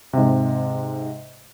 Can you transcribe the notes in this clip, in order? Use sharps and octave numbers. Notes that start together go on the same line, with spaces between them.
G#2 C3